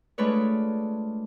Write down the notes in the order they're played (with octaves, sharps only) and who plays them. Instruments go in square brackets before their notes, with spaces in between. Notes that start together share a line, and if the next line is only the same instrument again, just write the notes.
[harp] G#3 A3 D4 F4 B4 C#5